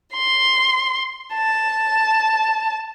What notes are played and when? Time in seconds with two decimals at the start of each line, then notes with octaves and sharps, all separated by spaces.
0.13 C6
1.34 A5